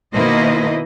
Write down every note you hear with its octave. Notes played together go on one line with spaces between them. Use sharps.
B2 D#3 A#3 E4 C5 D#5